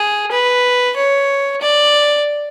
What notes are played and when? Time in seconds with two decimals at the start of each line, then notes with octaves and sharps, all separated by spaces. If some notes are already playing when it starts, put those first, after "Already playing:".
Already playing: G#4
0.32 B4
0.96 C#5
1.62 D5